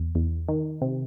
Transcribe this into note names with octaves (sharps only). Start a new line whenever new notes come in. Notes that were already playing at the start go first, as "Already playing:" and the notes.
Already playing: E2
E2
D#3
C3